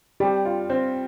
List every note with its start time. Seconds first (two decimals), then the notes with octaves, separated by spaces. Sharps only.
0.20 G3 G4
0.45 F4
0.70 C4